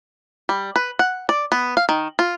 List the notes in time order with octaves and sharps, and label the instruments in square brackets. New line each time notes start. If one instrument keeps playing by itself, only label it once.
[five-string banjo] G3
B4
F#5
D5
B3
F5
D#3
F4